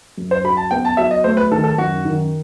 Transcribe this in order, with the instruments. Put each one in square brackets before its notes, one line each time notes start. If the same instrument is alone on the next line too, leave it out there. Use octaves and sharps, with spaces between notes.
[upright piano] F#2
[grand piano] C5
[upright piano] F#4 [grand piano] B5
[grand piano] A5
[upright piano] B3 [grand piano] G5
[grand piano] A5
[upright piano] F#3 [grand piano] E5
[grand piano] D#5
[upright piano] A3 [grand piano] C5
[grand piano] B4
[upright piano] D#3 [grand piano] A4
[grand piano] A4
[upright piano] F#2 [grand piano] F#4
[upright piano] D#3